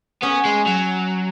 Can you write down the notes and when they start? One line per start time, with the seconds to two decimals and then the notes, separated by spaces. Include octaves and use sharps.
0.23 B3 C#4
0.46 G#3
0.67 F#3